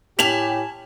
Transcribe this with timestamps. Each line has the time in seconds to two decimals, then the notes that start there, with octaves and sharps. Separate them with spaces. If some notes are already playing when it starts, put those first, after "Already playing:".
0.19 A2 G4 G#5 A5 B6 F7 F#7